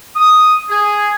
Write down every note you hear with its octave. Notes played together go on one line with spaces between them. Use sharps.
D#6
G#4